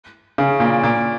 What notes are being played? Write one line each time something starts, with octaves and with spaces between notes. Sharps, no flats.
C#3
A#2
A#2